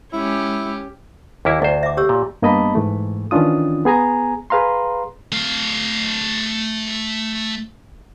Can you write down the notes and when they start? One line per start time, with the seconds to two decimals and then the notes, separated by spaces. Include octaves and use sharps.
0.13 G#3 C#4 E4 G4
1.45 D#2 A#3 E4
1.62 D2 E4 C5 D5
1.83 E5 D6
1.97 G4 C#5 E6
2.09 A#2
2.42 G2 A#3 B3 D#5 A5 B5
2.75 G#2 E3 A3
3.31 D#3 E3 C#4 D4 F4 D#6
3.85 B3 G#4 G#5 A#5
4.50 G#4 B4 F5 A#5 C6
5.32 A3 F5